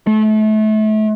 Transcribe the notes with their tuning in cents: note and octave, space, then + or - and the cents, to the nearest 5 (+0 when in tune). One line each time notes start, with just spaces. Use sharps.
A3 -30